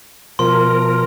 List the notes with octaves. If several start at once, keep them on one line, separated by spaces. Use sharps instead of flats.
B2 F3 A#4 C6